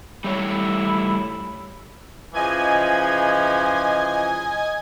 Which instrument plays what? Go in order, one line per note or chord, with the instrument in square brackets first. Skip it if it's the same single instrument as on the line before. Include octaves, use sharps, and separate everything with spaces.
[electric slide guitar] G3 A3 C#5 [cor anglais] E4
[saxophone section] C#3 E3 F3 [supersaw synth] D#5 G#5 G#6